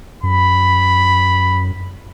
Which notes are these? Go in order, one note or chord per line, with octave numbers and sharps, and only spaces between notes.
F#2 B5